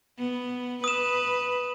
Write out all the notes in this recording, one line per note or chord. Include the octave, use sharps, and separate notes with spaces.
B3
B4 D#6 E7